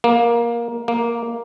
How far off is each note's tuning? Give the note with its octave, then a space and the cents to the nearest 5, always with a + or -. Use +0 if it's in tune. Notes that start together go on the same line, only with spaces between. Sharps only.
A#3 +15
A#3 +5